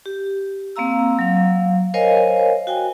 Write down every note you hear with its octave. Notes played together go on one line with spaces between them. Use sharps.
G4
A#3 C4 F5 A#5 E6
F#3 F5
A#4 C5 C#5 D#5 F5 G#5
F#4 G5 G#5